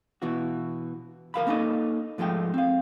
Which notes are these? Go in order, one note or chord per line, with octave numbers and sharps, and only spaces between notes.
B2 E3 F#4
D2 A#4 F5 B5
A#3 C#4 D#4 A4 D#5
G#2 F3 G#3 A3 G5
C4 F5